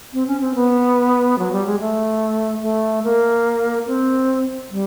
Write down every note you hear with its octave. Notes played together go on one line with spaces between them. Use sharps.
C4
C#4
C4
B3
F#3
G3
G#3
A3
A3
A#3
C4
G3